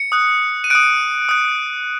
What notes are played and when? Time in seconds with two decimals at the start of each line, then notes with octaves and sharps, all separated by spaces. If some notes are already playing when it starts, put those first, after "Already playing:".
Already playing: C#7
0.12 D#6 F#6
0.64 D#7
0.70 D#6 F#6 D7
1.29 D#6 F#6